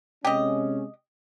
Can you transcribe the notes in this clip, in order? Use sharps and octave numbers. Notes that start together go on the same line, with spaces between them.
C3 G#3 C#4 G4 D#5